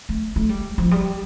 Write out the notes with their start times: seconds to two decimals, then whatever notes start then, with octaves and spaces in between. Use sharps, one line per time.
0.09 A3
0.36 A3
0.49 G3
0.78 F3
0.91 G3